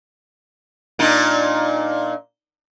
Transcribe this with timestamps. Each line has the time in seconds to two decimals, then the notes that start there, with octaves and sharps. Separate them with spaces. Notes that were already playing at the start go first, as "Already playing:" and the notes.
0.99 A#2 D4 D#4